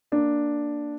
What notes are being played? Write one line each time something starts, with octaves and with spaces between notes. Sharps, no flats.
A#3 D4